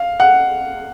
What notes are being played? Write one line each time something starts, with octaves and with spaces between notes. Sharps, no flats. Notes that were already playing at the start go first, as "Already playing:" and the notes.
Already playing: F5
F#5